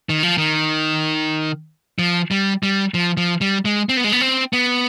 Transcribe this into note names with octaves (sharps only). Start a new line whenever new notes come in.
D#3
F3
D#3
F3
G3
G3
F3
F3
G3
G#3
C4
B3
G#3
B3
C4
B3